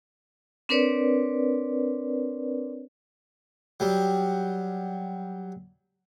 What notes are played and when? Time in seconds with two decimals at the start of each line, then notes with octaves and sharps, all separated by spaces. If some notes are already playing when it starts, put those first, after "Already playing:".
0.69 C4 D4 A#4 B4 C#5 D5
3.80 F#3 G3